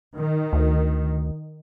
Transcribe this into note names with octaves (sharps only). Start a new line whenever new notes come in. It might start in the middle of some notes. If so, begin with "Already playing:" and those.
D#3
D2